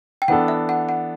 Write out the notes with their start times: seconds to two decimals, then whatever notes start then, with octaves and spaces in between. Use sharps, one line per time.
0.22 G5
0.28 E3 B3 D4 A4 F#5
0.48 E5
0.69 F#5
0.89 F#5